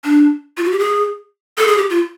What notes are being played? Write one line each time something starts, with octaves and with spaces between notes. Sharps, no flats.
D4
F4
F#4
G4
G#4
A4
G#4
G4
F4